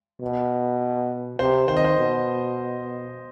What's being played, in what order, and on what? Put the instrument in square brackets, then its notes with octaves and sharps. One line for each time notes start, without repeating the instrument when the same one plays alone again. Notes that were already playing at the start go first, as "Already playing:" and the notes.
[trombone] B2
[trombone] C3 [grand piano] C5
[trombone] D#3 [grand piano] C5
[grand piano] D#5
C5
[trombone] B2